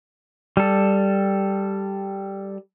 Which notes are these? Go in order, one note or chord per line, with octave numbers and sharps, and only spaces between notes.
G3 A4